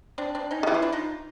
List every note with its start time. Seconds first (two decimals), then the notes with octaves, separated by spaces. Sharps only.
0.18 C4 D4
0.35 C4 D4
0.51 C#4 D#4
0.63 D#3
0.67 E3 E4
0.74 F4
0.82 D4 E4
0.92 D#4 F4